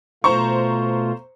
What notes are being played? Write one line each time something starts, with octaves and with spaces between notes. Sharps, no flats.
B2 A3 F4 C5 A#5 C#6